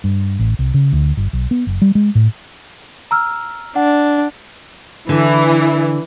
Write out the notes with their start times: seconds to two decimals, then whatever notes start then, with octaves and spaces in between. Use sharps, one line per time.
0.04 G2
0.39 A1
0.59 C2
0.74 C#3
0.93 D2
1.17 G1
1.33 B1
1.51 B3
1.67 F#1
1.82 G3
1.95 G#3
2.15 A2
3.11 A#5 E6 F6
3.76 D4 F#5
5.09 D3 E3